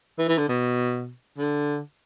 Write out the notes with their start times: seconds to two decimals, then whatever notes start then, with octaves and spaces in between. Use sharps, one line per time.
0.18 E3
0.28 E3
0.38 D3
0.49 B2
1.38 D3